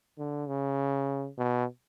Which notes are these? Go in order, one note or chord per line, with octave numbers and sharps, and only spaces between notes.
D3
C#3
B2